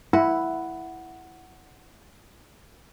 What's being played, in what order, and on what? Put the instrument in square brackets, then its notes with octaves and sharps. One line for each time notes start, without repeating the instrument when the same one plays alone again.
[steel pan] E4 [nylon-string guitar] F#5